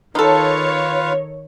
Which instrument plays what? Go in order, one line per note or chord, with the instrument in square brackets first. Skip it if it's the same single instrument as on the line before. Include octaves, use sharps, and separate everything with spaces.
[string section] D#3 C#5 [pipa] D#4 A4 [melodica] F4 B4 F5